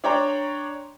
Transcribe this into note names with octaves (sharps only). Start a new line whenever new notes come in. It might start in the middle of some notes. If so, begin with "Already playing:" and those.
D4 C#5 D5 G5 A#5 C6